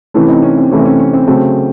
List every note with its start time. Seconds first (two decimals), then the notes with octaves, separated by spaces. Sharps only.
0.14 C3 E3 A3 C#4 E4
0.28 C4 D#4
0.42 C#4
0.57 C4
0.70 C3 E3 A3 C#4
0.79 C4
0.85 C#4
0.99 C#4
1.14 C4
1.28 C#3 F#3 A3 C4